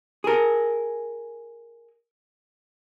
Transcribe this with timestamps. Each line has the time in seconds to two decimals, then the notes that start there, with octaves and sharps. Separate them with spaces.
0.24 G#4 A#4